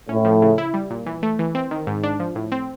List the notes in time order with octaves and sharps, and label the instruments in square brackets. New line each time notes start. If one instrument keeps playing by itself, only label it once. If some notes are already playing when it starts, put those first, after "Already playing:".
[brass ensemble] A2 [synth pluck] C#4
[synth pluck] F3
C#3
E4
G3
A#2
E3
A3
E3
C4
D#3
G#2
D4
F3
A2
C4